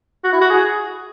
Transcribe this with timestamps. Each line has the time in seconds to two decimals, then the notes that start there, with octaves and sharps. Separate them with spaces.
0.24 F#4
0.32 E4
0.41 F#4
0.50 G#4